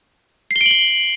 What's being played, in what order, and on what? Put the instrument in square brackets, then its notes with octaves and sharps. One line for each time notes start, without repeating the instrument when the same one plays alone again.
[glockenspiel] C7
G7
D7
F#7
G7